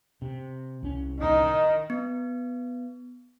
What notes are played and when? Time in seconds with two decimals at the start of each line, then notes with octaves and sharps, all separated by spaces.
0.22 C3
0.83 C2 C#4
1.20 D#3 D#4
1.90 B3